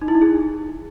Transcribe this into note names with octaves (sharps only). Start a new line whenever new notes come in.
D#4
E4
D#4
G#4